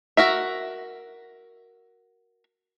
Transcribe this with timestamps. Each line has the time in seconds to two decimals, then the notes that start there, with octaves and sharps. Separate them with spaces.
0.17 F#4 A#4 E5